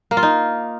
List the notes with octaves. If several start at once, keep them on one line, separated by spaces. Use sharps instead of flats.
A#3
F4
D#4